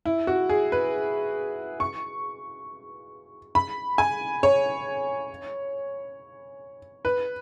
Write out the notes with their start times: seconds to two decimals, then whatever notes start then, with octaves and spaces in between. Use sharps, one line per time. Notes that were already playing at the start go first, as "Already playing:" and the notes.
0.06 E4
0.27 F#4
0.49 G#4
0.72 B4
1.80 C#6
3.55 B5
3.98 G#5
4.43 C#5
7.05 B4